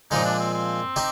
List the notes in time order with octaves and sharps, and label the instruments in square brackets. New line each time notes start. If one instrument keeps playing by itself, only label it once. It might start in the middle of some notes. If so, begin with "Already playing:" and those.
[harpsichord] A#2 F3 G#3 [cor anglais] D#4
[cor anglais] D4
C4
C4
[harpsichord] D#4 G4